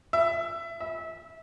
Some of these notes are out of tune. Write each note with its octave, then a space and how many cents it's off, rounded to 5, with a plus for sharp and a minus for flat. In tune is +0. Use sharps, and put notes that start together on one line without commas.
E5 +20
E5 -20